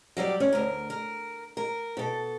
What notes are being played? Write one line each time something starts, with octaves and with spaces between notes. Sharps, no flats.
F#3 G3 G4 D5
C#4
D2 A#4
A#4
A#4
B2 A4